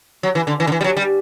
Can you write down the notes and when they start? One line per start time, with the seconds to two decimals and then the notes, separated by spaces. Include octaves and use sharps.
0.23 F#3
0.35 E3
0.47 D3
0.60 E3
0.67 D3
0.72 E3
0.81 G3
0.84 F#3
0.97 G3